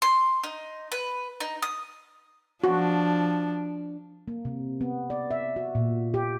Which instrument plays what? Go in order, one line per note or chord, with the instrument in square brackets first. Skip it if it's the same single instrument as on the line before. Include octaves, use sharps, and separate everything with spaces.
[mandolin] C6
D#4
B4
D#4
D#6
[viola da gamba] F3 D4 [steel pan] F#4
[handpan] A#3
C3
B3
D5
E5
F#4
A#2
G4